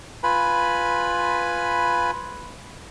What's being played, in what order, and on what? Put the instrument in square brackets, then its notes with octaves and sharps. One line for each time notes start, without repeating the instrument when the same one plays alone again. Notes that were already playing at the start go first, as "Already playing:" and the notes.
[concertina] F4 B4 G#5 B5